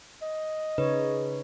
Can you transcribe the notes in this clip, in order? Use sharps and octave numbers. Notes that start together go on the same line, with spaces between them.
D#5
C#3 D#4 B4 C#5